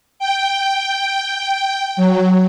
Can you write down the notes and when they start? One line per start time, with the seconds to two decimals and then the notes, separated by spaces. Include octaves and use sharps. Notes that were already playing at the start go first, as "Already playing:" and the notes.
0.19 G5
1.17 G5
1.97 F#3